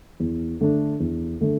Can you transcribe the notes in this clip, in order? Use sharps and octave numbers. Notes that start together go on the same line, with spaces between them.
E2
D3 A3 D4
E2
D3 A3 D4